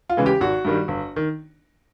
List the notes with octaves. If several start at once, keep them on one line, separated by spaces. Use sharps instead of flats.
F4
C#3 E3 G#3
G4
G#1 F#4
G2 D#3 G3
G1
D#3